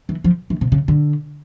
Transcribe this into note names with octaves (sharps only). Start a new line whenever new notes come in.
E3
F3
E3
C3
C#3
D3